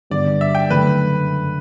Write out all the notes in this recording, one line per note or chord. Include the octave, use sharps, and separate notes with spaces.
G2 D3 G3 B3 D5
E5
G5
F#1 F#2 D3 A3 B4